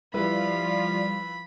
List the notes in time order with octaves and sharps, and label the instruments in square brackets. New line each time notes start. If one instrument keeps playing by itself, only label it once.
[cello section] F3 F4 [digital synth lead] G3 [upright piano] E4 B4 [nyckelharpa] B5